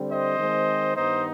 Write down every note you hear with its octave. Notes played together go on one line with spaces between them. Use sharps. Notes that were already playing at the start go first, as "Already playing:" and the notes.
Already playing: D3 G3 C4
C5 D#5
D#3 G#3 C4
G2 D#3 B3 D#4 C5 D#5